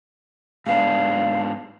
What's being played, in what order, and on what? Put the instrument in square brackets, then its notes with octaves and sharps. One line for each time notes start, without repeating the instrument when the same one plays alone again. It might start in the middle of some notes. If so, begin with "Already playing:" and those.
[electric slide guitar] G#2 B3 D4 [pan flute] F5